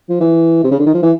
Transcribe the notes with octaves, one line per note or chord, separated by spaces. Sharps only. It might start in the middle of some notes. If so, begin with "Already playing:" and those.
F3
E3
C3
C#3
D3
D#3
F3
E3